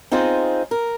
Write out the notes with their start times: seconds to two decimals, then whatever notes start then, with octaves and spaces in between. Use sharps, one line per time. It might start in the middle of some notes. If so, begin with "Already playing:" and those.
0.12 C4 D#4 F4 G#4 C5
0.71 A#4